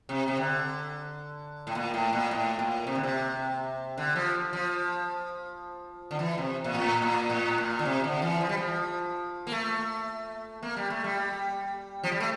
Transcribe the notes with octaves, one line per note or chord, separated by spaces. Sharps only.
C3
C3
D3
A2
A#2
A2
A#2
A2
A#2
C3
D3
C3
D3
F3
F3
D3
E3
C3
A#2
A2
A#2
A2
A#2
D3
C3
D3
E3
F3
G3
F3
A#3
A3
A#3
G3
A3
G3
F3
G3
A3